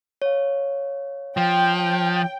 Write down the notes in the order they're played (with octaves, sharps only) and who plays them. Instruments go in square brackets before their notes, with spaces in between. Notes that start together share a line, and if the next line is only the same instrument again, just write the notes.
[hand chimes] C#5 F5
[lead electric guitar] F3 [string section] G5